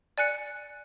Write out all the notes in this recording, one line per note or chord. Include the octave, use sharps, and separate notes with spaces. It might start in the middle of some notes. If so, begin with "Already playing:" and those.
D5 G#5 F#6 C#7